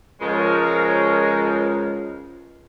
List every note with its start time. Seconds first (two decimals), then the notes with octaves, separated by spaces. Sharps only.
0.21 C#2 F3 G#3 A#4 C#5